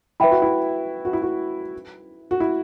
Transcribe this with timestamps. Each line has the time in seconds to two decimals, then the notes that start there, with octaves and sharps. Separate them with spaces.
0.20 E4 B4 E5 G5 B5
0.31 F#4
0.42 E4
1.05 F#4
1.13 E4
1.22 F#4
2.31 F#4
2.40 E4